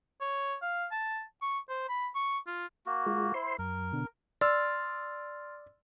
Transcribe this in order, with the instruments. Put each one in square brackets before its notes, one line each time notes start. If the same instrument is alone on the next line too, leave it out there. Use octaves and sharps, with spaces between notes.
[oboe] C#5
F5
A5
C#6
C5
B5
C#6
F4
[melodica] A#3 F#4
[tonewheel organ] G#3 F4
[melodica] E4 [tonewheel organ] C5 C6
[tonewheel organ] F#2 [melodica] A#4
[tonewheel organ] B2 D3
[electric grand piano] D5 E6 [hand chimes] C6 F6 A6